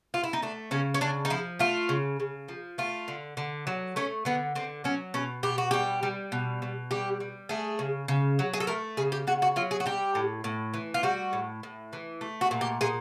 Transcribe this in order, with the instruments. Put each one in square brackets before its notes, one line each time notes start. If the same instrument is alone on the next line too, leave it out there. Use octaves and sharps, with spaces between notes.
[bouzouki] F4
E4
D#4
A3 D4
C#3 C#4
C#4
C#3 D4
D#4
F3 E4
A3 F4
C#3
C#3
F3
A3 F4
D3
D3
F#3
A3 C#4
D3 B3
D3 C4
F#3 C#4
B2 C#4
B2 G4
F#4
G3 G4
G3
B2
B2
G3 G4
G3
A3 G#4
C#3
C#3
F#3
G#4
A4
A3 A#4
C#3 G#4
G4
C#3 F#4
F#4
F#3 F4
G#4
F#4
G3 G4
A2
A2
E3
F4
G3 F#4
A2
A2
E3
A3
F#4
A#2
G4
A#2 G#4